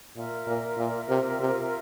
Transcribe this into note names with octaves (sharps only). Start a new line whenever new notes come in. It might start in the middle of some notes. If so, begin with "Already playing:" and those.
A#2 F4 A#4 E5
A#2
A#2
C3
C3